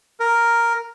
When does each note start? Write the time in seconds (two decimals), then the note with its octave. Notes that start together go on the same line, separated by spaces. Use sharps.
0.20 A#4